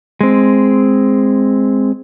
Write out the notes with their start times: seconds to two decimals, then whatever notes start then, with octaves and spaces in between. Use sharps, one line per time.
0.21 G#3 C4